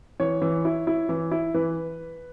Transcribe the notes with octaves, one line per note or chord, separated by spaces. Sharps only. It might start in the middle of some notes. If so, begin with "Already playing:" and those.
E3 C#5
E3
E4
E4
E3
E4
E3 B4